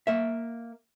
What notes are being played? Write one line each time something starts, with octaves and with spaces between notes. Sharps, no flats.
A#3 E5